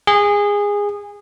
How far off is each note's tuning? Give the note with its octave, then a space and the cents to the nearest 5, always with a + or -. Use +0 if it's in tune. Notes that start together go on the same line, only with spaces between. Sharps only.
G#4 -20